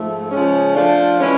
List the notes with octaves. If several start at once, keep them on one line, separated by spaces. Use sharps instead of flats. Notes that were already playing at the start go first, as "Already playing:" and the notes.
Already playing: G#2 F3 A3
C#3 F3 G#3 C#4
F3 A3 D4 F4 A4
E3 G#3 C#4